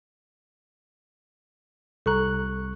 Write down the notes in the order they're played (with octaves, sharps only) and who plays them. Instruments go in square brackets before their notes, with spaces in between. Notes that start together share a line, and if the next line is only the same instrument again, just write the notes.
[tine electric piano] C2 C#6 F#6 [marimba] A4 A#5